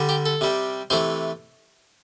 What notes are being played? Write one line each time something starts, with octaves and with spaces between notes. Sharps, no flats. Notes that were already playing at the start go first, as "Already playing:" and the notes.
Already playing: D3 G3
G4
A4
C3 G3
C3 E3 A3 C5